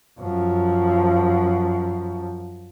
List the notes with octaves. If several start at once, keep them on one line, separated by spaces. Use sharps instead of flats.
F#2 F3